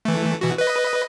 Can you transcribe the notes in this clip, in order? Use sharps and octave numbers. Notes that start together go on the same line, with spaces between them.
E3 A3
B2 E3 F#4
B4 D#5